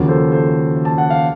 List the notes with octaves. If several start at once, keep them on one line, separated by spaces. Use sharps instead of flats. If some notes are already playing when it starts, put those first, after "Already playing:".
Already playing: D#2 C#3 F3 F#4 A#4
A4 C5
A4 C5
A5
F#5
F5